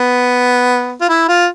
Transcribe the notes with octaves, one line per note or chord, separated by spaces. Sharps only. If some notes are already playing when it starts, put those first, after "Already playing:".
Already playing: B3
F4
E4
F4